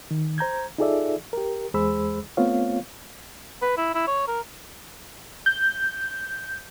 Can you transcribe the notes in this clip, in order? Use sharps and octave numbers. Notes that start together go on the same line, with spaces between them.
D#3
C5 A#5 G6 G#6
D#4 F4 G#4 A4 D5 E5
G4 A#4
E2 G#3 G#4 C5 B5 E6
A3 B3 C4 F4 C#5 F5
B4
E4
E4
C#5
A#4
G6